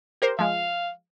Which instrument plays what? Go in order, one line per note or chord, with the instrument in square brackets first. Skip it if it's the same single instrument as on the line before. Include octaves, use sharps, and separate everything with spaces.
[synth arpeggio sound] G4 A#4 C5
[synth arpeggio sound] F3 G#3 [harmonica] F5